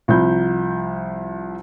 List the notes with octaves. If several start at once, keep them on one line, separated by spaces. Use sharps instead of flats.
C2 F3 B5 G6